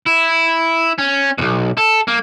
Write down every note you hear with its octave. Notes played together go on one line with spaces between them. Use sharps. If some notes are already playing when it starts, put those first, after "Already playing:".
E4
C#4
B1 E2
A4
A#3